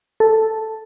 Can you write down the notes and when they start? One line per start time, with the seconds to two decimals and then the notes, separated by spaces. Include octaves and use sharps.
0.20 A4